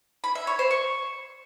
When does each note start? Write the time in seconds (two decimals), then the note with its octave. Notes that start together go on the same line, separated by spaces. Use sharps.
0.24 B5
0.35 E5
0.47 C#5
0.59 C5
0.71 C#6